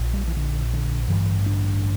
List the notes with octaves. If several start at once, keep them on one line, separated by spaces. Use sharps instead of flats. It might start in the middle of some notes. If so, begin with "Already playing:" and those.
Already playing: A#1 A#2
G3
E3
D3
D3
A1 G2 D3 E3
D4